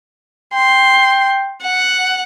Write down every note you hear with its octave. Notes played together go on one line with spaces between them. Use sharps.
G5 C6
F#5